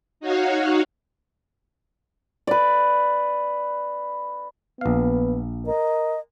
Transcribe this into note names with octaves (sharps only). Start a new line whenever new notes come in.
D#4 F#4 C#5 F5 F#5
B4 D5
A#1 B3 F5
A#4 D#5